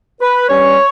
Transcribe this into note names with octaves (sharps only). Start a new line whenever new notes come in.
B4
G2 G3 C#4 C#5